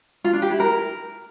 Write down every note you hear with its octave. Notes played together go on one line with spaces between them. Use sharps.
F4
D4
G4
E4
A#4